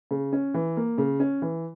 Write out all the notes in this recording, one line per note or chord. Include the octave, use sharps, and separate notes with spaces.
C#3
C#4
E3
A#3
C#3
C#4
E3